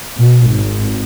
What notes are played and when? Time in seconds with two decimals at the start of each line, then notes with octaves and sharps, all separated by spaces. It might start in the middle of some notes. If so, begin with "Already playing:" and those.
0.17 B2
0.46 G#1